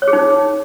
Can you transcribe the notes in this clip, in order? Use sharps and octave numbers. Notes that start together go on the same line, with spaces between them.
C#5
G#4
D#4